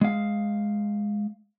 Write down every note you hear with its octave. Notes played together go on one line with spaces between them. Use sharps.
G#3 F5